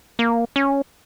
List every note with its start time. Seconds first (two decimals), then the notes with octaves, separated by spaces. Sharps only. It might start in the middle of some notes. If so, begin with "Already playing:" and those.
0.19 A#3
0.56 C#4